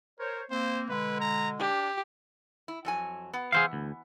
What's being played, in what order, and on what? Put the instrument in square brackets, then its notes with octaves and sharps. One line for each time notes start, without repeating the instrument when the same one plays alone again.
[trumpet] A#4 [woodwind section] C5 C#5
[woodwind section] A#3 C4 [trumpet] C5
[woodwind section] B2 D3 G#3 [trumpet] B4
[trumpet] A#5
[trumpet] D4 [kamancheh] G4
[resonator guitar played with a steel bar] E4
F2 F#3 G#5
B3
[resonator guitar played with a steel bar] E3 B3 [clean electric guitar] G#4 C5 F5
[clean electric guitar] D2